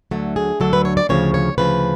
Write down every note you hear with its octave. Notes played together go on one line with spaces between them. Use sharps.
D2 D3 F#3 A3
G#4
D2 D3 F#3 A4
B4
C#5
D5
D2 C#3 F3 C#5
C#5
D2 C#3 F3 B4